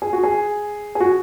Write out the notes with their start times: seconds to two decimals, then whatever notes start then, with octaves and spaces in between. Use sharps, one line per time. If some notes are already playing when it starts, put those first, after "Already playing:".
0.02 G#4
0.13 F#4
0.23 G#4
0.95 G#4
1.00 F#4